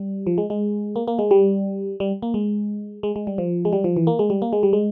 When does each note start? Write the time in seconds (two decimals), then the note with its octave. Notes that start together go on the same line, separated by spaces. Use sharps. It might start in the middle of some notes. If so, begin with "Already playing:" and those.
Already playing: G3
0.27 F3
0.38 G#3
0.50 G#3
0.96 A#3
1.08 A#3
1.19 G#3
1.31 G3
2.00 G3
2.22 A#3
2.34 G#3
3.03 G#3
3.16 G#3
3.27 G3
3.38 F3
3.65 G#3
3.73 G3
3.84 F3
3.97 E3
4.07 A#3
4.19 G#3
4.30 G3
4.42 A#3
4.53 G#3
4.63 G3
4.73 G#3